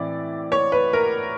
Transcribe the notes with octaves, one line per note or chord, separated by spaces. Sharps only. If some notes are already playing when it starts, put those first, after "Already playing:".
Already playing: A2 E3 C4 E4 D5
C#5
B4
A#4